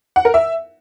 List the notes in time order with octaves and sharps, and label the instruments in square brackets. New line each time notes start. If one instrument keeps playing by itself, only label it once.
[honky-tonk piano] F#5
A#4
E5